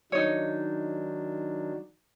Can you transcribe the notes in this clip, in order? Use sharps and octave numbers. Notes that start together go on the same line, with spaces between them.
D#3 F#3 D4 D#4 C#5